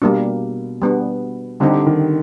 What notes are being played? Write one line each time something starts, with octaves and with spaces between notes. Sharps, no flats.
B2 G3 A#3 D4
G3 B3 D4
D3 G3 C4 D#4 G4
D#3